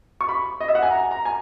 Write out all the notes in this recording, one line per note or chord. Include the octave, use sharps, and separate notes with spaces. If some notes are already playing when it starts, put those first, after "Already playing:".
C#6
B5
D#5
E5
F#5
G#5
A#5
A#5
G#5